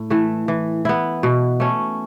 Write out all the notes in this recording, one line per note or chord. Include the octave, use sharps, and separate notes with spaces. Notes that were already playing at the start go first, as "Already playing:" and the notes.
Already playing: A2
E3 A3
E3
B3 E4
B2
A3 C#4